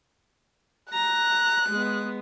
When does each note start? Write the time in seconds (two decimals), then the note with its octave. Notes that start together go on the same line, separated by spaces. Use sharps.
0.93 A#5 F#6
1.69 G#3 B3